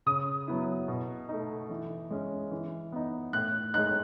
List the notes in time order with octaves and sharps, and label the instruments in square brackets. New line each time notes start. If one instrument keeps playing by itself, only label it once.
[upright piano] C#3 D#6
F#3 B3 E4
B2
A3 D#4
E3
G#3 C#4
E3
B3 D#4
A2 F#6
G#3 D#4 F#6